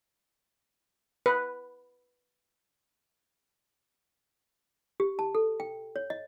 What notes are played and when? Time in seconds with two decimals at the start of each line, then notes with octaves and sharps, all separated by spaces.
1.26 B4
5.00 G4
5.19 A5
5.35 A4
5.60 G5
5.96 C#5
6.10 D#5